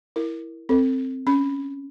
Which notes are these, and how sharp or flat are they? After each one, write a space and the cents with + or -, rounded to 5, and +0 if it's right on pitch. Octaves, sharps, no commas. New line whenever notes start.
E4 +0 A#4 +0
C4 +0 A4 +35
C#4 +5 B5 +0